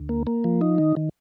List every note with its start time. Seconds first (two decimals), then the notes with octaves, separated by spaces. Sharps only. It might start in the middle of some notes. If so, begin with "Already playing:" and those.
Already playing: D2
0.09 A#3
0.27 A#3
0.44 F3
0.61 D#4
0.78 D#3
0.97 D#3